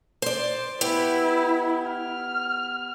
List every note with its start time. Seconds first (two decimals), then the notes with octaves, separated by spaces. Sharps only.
0.22 C5 D5
0.81 B3 E4 G4
1.90 F6